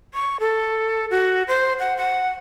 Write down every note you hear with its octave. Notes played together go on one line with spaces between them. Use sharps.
C#6
A4
F#4
C5
F#5
F#5